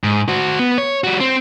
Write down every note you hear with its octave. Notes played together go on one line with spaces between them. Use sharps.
G#2
F#4 C5
B3
C#5
G3 F#4
C4